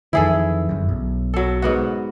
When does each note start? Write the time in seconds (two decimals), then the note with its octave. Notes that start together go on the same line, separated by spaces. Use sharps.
0.13 F2 D#3 E3 E4 G#4 A4
0.69 G1 F#2
0.89 B1
1.34 F#3 A4
1.62 G#2 B3 F#4